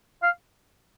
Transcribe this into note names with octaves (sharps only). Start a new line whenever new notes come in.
F5